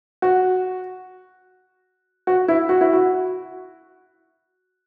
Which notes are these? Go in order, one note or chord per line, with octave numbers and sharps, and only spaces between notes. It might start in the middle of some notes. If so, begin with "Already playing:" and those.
F#4
F#4
E4
F#4
E4
F#4